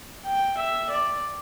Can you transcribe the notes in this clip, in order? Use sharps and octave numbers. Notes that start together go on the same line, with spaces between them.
G5
E5
D5